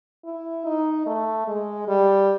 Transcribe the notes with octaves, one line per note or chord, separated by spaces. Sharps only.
E4
D#4
A3
G#3
G3